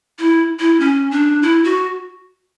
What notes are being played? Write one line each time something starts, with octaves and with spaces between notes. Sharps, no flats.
E4
E4
C#4
D4
E4
F#4